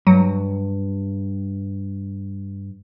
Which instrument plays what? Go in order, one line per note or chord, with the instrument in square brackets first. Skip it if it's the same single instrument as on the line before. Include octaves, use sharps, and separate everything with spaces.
[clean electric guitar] G2 [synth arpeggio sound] F#3